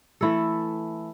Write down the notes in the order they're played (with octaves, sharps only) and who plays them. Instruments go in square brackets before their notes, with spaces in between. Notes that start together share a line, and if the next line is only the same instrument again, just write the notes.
[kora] E3 A3 E4 A4